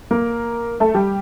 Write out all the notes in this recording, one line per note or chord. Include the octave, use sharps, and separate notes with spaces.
A#3 A#4
A3 A4
G3 G4